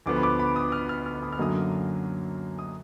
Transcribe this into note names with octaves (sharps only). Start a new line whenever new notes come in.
D2 D3 F3 B3 D6
B5
D6
B5
D#6
F6
F6
F6
D#6
F6
F#2 D3 F#3 A#3 D#6
D#6